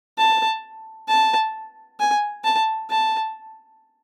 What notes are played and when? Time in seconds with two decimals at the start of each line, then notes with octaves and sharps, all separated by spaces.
0.18 A5
1.08 A5
2.00 G#5
2.44 A5
2.90 A5